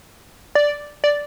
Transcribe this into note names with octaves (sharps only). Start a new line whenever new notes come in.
D5
D5